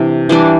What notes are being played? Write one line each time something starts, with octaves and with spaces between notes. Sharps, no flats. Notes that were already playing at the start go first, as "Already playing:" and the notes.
Already playing: C3 E3 D4
E3 G3 D4